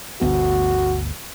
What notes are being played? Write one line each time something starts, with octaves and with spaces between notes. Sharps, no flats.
G1 D2 B3 F#4